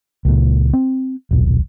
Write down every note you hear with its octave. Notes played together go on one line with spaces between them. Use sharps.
C#2 A#2
C4
D#1 B1